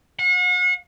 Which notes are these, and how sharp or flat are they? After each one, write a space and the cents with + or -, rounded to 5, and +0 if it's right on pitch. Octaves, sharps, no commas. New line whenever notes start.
F#5 -40